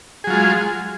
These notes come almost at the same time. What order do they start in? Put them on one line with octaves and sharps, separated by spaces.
G#4 F#3 F4 G#3